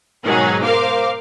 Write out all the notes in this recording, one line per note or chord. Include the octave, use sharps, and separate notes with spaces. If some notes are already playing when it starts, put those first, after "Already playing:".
G#2 B2 D#3 F#3 D#4 G#4
A#4 C5 F5 D6